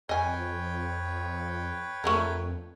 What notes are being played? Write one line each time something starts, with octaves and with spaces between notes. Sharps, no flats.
F2 B4 C#5 D#5 G5 G#5
F2 A3 D4 A#4